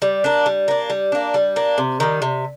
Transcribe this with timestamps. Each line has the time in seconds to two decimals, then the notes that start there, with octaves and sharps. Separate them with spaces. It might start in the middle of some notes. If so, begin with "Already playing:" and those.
0.02 G3
0.24 A#3 D4
0.46 G3
0.68 A#3 D4
0.90 G3
1.12 A#3 D4
1.34 G3
1.56 A#3 D4
1.78 C3
2.00 D#3 G3
2.22 C3